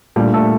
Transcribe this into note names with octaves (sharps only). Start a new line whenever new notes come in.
A#2 G3 A3 D4 G4
A3 A4